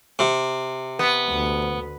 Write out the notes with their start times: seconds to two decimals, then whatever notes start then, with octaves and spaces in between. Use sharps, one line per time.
0.19 C3
0.99 B3
1.28 D2